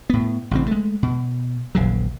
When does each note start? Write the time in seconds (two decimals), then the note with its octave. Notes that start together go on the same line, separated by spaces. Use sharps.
0.10 A2 B3
0.51 A1 C#3 C4
0.67 G#3 A3
1.03 B2
1.75 D#1 A#1 C#3 F#3